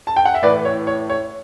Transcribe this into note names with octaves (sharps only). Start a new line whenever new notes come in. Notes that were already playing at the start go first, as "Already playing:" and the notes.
A5
G5
F#5
E5
A2 E3 B4 D5
C#5
C#5
C#5